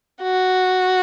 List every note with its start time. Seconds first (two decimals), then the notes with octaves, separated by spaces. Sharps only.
0.22 F#4